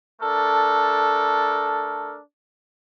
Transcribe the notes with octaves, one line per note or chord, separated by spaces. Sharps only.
A3 D4 A4 A#4